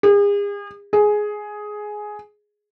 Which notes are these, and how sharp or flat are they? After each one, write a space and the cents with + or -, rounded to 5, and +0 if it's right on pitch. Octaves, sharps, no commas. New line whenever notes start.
G#4 -40
G#4 +10